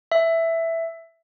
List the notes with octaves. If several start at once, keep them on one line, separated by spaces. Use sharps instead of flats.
E5